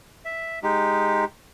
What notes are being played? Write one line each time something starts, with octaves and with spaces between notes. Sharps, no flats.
E5
G#3 D#4 G4